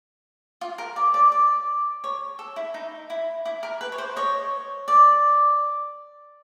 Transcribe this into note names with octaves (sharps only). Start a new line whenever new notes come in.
F4
A#4
D5
D5
D5
C#5
A4
E4
D#4
E4
E4
A#4
B4
C#5
C5
C#5 D#5
D5